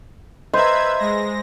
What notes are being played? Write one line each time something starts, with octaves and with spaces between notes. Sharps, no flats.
B4 C5 D#5 E5 A#5 G#6
G#3 A#6